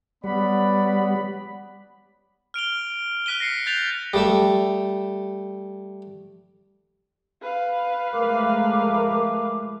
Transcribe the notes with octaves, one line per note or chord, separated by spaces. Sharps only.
G3 B3 C#4 D5 F#5 B5
F6 D7 F7 G7
F6 F#6 B6 D#7 G7
A#6 C7 C#7
F#6 G6 A6 B6 F7
G3 A3 E5
B4 F5
F3 G#3 A3 A#4 D6